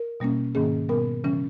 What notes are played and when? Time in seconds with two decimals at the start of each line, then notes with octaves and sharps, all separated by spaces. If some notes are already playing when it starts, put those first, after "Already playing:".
Already playing: A#4
0.20 B2 G3 A#3 C#4
0.55 G#2 D#3 A#3 C#4 G#4
0.89 B2 G3 B3 A#4
1.24 C#3 E3 G3 C#4